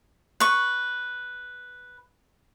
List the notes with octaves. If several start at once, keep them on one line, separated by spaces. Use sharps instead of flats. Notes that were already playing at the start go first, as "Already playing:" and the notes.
B4 C#6